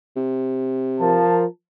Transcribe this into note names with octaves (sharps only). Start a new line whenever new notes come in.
C3
F3 A#4 A5